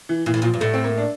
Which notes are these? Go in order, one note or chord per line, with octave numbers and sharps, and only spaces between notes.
E3
A#2 E3
A2
A#2 F3
G2
A2 A3
C4
A#3
D4